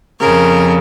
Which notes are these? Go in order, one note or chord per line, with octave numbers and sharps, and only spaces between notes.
F2 C#3 A#4